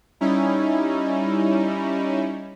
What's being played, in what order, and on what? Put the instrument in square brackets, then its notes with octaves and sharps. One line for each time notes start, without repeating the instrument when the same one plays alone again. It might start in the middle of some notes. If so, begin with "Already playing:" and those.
[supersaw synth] G3 C#4 D#4 E4